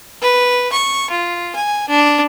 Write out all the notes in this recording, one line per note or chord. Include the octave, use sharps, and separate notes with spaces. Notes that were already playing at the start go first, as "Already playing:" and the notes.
B4
C#6
F4
G#5
D4